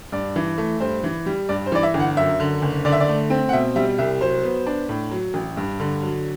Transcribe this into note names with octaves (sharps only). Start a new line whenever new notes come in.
G2 D5
E3
A3
G2 C5
E3
G3
G2 D5
C5
E3 D5
E5
G1
F#5
F#2 E5
D3
F#1
D3 D5
E5
D5
A3
C4
F#5
B2 E5
G3 E5
C2 E5
F#3 C5
B3
D4
A2
F#3
A1
G2
D3
F#3